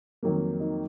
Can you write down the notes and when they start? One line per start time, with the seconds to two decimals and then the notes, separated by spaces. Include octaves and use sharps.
0.23 F2 D#3 F#3 A#3
0.60 D#4